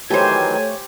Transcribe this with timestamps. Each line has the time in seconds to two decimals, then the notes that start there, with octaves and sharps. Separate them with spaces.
0.10 D#3 E3 F#3 A3 G4 C5 C#5 G#5